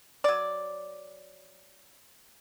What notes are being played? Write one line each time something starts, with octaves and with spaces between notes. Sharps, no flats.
F#3 D5